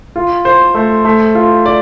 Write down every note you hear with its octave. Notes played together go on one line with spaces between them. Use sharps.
F4
C5
A3
A3
F4
D5